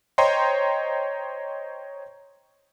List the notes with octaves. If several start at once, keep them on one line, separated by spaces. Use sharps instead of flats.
C5 C#5 D#5 G5 A#5 C6